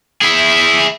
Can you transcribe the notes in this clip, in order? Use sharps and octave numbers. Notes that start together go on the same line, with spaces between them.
E4 G#4